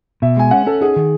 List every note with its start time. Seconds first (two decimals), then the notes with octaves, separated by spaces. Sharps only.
0.22 B2 E5
0.37 G#3 G#5
0.51 C#4 F#5
0.66 C#4 A4
0.81 D#4 G#4
0.96 D#3